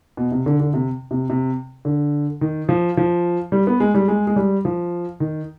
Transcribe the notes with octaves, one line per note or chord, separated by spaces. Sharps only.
B2
C3
D3
D3
C3
C3
C3
D3
D#3
F3
F3
G3
B3
G#3
G3
G#3
G#3
G3
F3
D#3